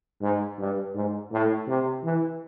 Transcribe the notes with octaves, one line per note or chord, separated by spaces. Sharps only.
G#2
G2
G#2
A2
C3
E3